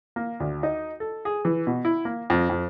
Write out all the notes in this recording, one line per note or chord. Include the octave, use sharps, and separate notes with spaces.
A#3
D2
D#4
A4
G#4
E3
B2
E4
A#3
F2
F2